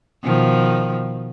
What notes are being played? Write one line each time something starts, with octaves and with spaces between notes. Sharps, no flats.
B2 D#3 F3